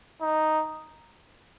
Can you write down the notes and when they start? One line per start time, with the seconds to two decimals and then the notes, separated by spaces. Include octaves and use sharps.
0.22 D#4